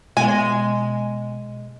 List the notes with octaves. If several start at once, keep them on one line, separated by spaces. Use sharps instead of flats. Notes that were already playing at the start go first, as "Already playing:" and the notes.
B2 G#3 G#5